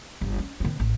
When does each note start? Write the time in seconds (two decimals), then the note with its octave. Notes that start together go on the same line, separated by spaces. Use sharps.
0.21 G1
0.38 C#4
0.60 D#3 C4
0.80 A1